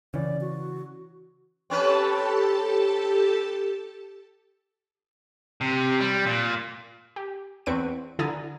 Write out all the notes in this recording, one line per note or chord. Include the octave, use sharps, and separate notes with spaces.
C#3 E3 D5
F#4
C4 C#4 G4 A4 B4 A5
C3
G3
A#2
G4
E2 C4 B4 C#6 D7
D3 E4 G#5 A#5 D#6 A6